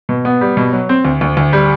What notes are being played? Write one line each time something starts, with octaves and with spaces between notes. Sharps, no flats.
B2
B3
G3
B2
F#3
C4
D2
D2
D2
G3